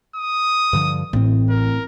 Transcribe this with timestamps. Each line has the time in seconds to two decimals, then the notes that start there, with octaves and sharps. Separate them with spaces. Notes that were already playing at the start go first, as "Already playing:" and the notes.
0.16 D#6
0.73 G2 D3 F3
1.13 A1 A2 C4
1.50 A#4